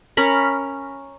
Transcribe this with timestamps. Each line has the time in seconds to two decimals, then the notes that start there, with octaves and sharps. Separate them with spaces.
0.17 C#4 A#4 B5